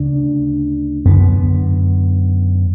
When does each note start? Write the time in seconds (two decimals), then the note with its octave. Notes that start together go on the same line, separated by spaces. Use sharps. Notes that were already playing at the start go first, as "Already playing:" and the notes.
Already playing: D2 C#3 D4
1.05 F#2 D3 B3